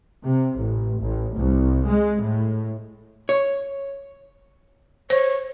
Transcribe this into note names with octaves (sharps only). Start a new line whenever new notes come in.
C3
A1
A1
C2
G#3
A2
C#5
C5 C#5